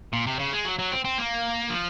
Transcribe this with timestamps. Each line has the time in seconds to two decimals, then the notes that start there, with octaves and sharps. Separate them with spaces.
0.13 A#2
0.27 C3
0.39 C#3
0.53 G#3
0.65 F#3
0.79 F#3
0.92 C4
1.05 C4
1.18 A#3
1.70 F3